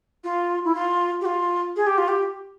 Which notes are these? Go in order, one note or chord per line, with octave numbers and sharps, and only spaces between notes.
F4
E4
F4
G4
F4
G#4
G4
F4
G4